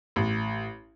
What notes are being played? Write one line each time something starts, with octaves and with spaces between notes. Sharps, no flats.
A1